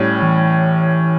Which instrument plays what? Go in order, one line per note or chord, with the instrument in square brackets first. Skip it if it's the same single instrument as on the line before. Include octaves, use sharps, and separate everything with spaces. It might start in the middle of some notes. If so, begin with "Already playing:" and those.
Already playing: [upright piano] A2 G3 C#4
[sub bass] E3